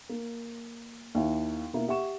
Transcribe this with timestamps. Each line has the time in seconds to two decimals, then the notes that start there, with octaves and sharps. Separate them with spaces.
0.09 A#3
1.15 D#2 E4
1.73 B2 A#3 E4
1.88 G4 E5 F#5 C#6 E7